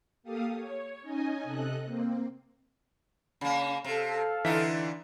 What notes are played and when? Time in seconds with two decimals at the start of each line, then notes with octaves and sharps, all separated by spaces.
0.23 A#3 G4 A4 F5 D#6
0.53 C#5
1.01 C#4 D#4 D#5 G#5
1.43 C3 A4 D#5 F#6
1.85 A#3 C4
3.41 C#3 A#3
3.85 C3 A4 F5
4.45 D3 E3 D#4 F4 E5 B6